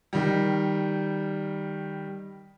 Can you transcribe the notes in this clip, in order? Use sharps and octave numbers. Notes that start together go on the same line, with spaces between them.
D#3 G3